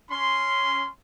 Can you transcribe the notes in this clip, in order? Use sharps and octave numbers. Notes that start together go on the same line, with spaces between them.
C#4 C6